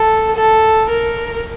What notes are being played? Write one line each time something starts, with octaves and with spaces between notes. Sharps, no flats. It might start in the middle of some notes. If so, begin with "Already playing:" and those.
Already playing: A4
A4
A#4